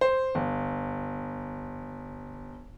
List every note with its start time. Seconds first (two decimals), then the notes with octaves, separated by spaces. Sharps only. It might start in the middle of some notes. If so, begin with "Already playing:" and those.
0.01 C5
0.35 G1